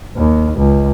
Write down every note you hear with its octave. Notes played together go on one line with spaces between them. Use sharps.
D#2
C#2